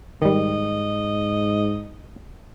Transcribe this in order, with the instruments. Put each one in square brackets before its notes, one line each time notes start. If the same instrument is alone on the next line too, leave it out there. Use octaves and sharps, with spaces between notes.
[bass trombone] G#2 [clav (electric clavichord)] D#3 G3 [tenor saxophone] D#5